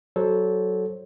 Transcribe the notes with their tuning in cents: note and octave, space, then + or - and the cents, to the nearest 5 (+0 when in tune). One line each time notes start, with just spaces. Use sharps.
F#3 +15 A4 -15 C5 +15